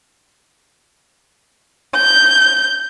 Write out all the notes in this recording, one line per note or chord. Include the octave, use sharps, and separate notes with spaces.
G6